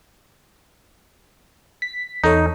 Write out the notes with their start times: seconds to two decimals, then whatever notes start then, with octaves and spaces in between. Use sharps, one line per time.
1.82 B6
2.24 E2 D#4 A4 C#5